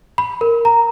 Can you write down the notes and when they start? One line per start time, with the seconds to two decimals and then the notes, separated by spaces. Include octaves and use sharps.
0.18 B5
0.41 A#4
0.65 A#5